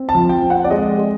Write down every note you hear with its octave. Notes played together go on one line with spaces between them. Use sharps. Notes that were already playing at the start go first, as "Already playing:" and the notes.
Already playing: C4
A5
F3
G5
C4
F#5
D5
G#3 D#5
G#3